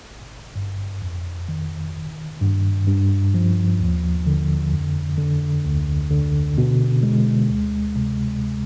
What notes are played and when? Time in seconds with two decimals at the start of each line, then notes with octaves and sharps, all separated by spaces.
0.10 G#1
0.56 G2
1.02 F2
1.49 D#3
1.95 G1
2.42 G2
2.88 G2
3.34 F3
3.80 D#2
4.27 D3
4.72 F2
5.18 D3
5.65 D2
6.11 D3
6.58 B2
7.03 G#3
7.50 D2
7.96 C3